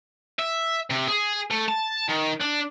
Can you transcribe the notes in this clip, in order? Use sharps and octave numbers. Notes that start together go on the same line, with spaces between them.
E5
C3
G#4
A3
A5
D#3
D4